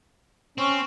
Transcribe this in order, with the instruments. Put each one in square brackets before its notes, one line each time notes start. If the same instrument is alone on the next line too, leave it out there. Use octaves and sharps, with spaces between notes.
[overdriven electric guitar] C4 [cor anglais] C#4